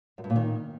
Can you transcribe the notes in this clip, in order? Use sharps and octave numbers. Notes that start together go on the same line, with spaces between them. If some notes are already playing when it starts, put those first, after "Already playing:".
F#2
G2
A#2
D#3